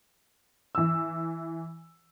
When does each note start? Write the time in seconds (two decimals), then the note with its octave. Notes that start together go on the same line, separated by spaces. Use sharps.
0.75 E3 E6